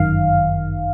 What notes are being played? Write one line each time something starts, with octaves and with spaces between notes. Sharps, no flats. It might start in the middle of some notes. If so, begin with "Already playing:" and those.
Already playing: G1 F#2 D#3 F5